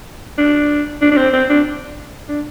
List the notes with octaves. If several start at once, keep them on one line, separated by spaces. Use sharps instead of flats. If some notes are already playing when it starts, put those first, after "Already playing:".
D4
D4
D4
C4
C4
D4
D4